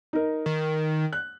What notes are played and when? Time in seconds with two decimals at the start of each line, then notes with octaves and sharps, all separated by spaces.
0.13 D#4 A#4
0.46 D#3
1.13 F#6